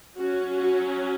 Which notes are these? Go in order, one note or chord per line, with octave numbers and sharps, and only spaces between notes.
F#3 C#4 F#4
F#4